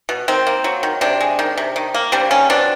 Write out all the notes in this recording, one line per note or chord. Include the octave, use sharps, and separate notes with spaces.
B2
D#3 C4
A#3
F#3
D#3
C3 C4 D4
G#3
D#3
C3
D#3
A#3
G3 C4 D4
D#3 C#4
B2 C4 D4